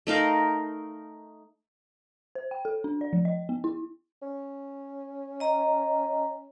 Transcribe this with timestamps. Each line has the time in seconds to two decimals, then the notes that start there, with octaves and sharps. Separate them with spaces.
0.07 A3 D#4 A#4 F5
2.35 C5
2.51 G5
2.65 A4
2.84 D4
3.01 D5
3.13 F3
3.25 D#5
3.49 B3
3.64 E4
4.22 C#4
5.40 D#5 A#5